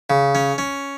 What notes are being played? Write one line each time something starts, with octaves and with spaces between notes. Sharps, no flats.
C#3
C#4
C#4